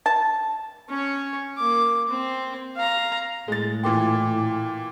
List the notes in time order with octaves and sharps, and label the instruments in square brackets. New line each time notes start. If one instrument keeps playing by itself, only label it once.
[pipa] A5
[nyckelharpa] C#4 C#5
A#3 D6
C4
F5 A#5
[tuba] A2 [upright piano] G#3 A6
[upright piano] A#2 E3 C6 [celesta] G5 D6